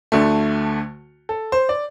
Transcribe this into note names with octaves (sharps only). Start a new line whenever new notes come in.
D2 D3 A3
A4
C5
D5